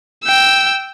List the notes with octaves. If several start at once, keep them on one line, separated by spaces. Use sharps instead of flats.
G5 E6